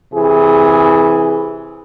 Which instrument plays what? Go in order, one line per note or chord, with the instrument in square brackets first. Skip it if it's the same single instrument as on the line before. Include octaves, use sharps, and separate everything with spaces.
[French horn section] C3 E3 G#4